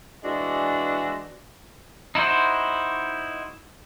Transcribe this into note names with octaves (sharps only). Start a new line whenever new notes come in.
E3 G#3 D4 F#4
D#4 E4 F#4 C5